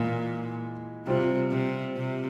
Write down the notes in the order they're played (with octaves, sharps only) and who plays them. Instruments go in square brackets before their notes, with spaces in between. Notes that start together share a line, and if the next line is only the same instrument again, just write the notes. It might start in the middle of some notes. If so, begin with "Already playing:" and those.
Already playing: [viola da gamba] A#2 [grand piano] E3 G#3
[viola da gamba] C3 [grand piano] G3 C4 F4
[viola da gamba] C3
C3